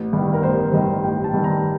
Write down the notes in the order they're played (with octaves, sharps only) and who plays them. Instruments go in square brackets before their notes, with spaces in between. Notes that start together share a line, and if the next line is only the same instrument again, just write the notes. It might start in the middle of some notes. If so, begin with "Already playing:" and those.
Already playing: [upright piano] A1
G2 D#3
A#4
A1 C5
G2 D#3 D#5
A1 G5
A5
G2 D#3
A#5